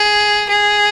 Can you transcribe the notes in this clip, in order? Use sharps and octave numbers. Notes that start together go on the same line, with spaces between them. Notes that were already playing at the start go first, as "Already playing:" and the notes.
Already playing: G#4
G#4